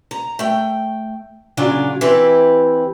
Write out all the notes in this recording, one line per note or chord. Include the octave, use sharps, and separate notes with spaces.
A#5
A3 G5
A#2 C#3 F#3 D4 F4
E3 C4 E4 G4 B4